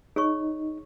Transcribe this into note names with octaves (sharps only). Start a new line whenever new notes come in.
D#4 G#4 C#5 C#6